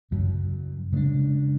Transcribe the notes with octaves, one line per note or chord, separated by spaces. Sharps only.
F#2 C#3 F#3
C#3 G#3 D4